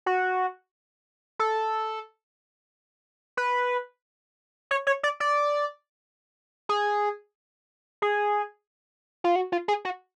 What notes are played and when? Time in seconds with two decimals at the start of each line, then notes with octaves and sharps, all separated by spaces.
0.06 F#4
1.39 A4
3.37 B4
4.71 C#5
4.87 C#5
5.03 D5
5.20 D5
6.69 G#4
8.02 G#4
9.24 F4
9.36 F#4
9.52 F4
9.68 G#4
9.85 F#4